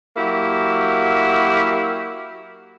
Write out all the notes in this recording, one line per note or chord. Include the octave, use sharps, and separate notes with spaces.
F#3 A#3 E4 F#4 G4